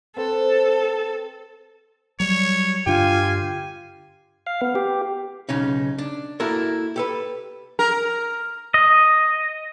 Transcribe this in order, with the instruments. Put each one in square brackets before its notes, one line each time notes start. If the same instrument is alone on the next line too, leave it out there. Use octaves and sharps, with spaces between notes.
[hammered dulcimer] C4 B4 C6 [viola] A4
[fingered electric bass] F#3 G3 [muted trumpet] C#5
[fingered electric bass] G2 D3 D4 [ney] F4 [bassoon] G4 [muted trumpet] G#5
[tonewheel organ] F5
B3
G4
[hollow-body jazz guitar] B1 C#3 C#4 D#4
D4
A#3 E4 F#4 A4 A#4
G4 A4 B4
[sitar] A#4
[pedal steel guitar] D#5